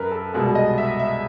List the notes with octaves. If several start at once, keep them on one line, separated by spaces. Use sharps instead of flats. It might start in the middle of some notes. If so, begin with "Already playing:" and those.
Already playing: F#2 A#4 B4
A4
C2 B2 G#3 A4
D#5
E5
E5